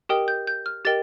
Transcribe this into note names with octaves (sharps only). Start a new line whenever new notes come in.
G4 A#4 D#5 G5 D#6
G6
G6
F6
G4 A#4 D#5 G5 A6